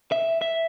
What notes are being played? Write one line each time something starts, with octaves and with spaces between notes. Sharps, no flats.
E5
E5